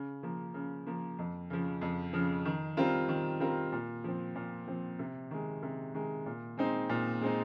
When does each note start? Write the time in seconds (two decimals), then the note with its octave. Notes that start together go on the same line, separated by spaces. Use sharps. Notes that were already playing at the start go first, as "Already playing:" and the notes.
Already playing: C#3
0.23 F3 A#3
0.54 C#3
0.86 F3 A#3
1.19 F2
1.50 C#3 F3
1.81 F2
2.13 C#3 F3
2.45 D#3
2.77 G3 C4 F4 A#4
3.09 D#3
3.40 G3 C4 F4 A#4
3.72 A#2
4.04 F3 C4
4.36 A#2
4.67 F3 C4
4.99 C3
5.31 D#3 G#3
5.63 C3
5.94 D#3 G#3
6.26 A#2
6.57 G#3 C4 D#4
6.90 A#2
7.21 G#3 C4 D#4